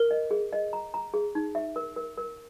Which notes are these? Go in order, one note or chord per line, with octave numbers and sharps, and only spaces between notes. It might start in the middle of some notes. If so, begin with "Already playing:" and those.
Already playing: A#4
D#5
G#4
D#5
A#5
A#5
G#4
D#4
E5
A#4
A#4
A#4